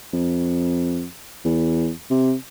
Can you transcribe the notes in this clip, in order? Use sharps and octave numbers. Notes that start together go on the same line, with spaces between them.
F2
E2
C3